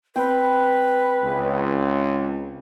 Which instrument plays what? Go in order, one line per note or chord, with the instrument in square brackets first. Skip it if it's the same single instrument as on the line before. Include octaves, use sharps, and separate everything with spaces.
[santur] C4 G5 [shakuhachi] B4
[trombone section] C#2